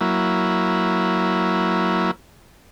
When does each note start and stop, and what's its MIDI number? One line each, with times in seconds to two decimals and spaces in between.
0.01 2.11 54
0.01 2.11 58
0.01 2.11 64